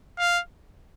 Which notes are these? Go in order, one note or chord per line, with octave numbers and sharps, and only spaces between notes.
F5